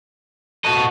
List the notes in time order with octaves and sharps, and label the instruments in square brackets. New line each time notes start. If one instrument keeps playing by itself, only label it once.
[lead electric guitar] B3 A4 [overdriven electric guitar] F#4 D#5